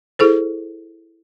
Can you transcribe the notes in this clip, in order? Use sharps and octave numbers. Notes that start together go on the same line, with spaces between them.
E4 G#4 A4 C5